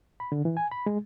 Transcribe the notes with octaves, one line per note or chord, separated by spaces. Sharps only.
B5
D3
E3
G#5
B5
G#3